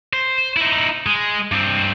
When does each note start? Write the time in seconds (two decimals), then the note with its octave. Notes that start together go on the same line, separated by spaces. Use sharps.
0.13 C5
0.57 D#4 E4
1.06 G#3
1.52 G2 C4